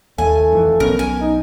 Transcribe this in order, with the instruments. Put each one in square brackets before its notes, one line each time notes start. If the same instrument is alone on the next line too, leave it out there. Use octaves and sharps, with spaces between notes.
[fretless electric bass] D#2 [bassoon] A3 [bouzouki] G#5
[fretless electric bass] F2 E3
[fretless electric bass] B1 B2 C#4 [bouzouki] A#4
[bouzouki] G#5
[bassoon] D#4